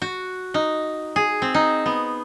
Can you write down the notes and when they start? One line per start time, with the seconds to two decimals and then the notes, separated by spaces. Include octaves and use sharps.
0.02 F#4
0.54 D#4
1.16 G#4
1.42 C4
1.54 D#4
1.86 B3